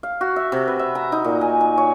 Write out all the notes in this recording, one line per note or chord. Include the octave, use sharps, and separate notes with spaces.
F5
F#4
E5
C3
B4
E5
A#5
D#4
A#2
G#5
G#5
C#5